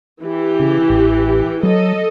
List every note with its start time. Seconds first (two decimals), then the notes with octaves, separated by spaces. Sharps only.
0.22 E3 G4
0.60 C#3
0.90 A1
1.63 F#3 A4 D#5